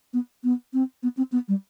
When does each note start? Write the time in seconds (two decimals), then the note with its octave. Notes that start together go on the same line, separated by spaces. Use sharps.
0.13 B3
0.44 B3
0.73 C4
1.03 B3
1.17 C4
1.32 B3
1.48 G3